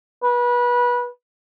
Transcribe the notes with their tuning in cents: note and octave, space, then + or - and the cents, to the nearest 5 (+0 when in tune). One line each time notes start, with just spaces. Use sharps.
B4 -25